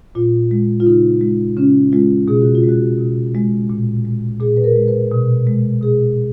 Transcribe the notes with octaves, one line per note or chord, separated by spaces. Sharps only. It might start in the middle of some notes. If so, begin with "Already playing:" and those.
A#2 F4
G#3
F4
C#3 D#4
G#3
C#3 C#4
G#3 F4
B2 G#4
F#4
F4
G#3
F#4
B2
G#3
A#2
G#3
A#2 G#4
B4
A#4
G#3
B4
B2
G#3
B2 G#4